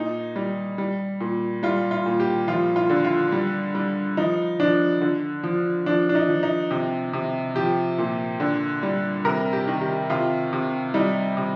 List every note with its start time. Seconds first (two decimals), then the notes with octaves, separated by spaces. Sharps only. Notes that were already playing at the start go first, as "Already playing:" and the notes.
Already playing: A#2 D#4
0.36 G3
0.78 G3
1.20 A#2
1.63 G3 F4
1.91 F4
2.06 A#2
2.20 G4
2.48 F3 F4
2.76 F4
2.90 D3
3.05 F4
3.32 G3
3.75 G3
4.17 F3 D#4
4.60 F3 D4
5.01 D3
5.43 F3
5.86 F3 D4
6.09 D4
6.15 D#4
6.29 F3
6.43 D#4
6.71 C3
7.13 C3
7.56 F3 G4
7.98 A#2
8.40 D3
8.83 G3
9.25 C3 A#4
9.53 G4
9.67 D#3
9.81 G4
10.10 C3 F4
10.53 C3
10.94 G3 D#4
11.37 C3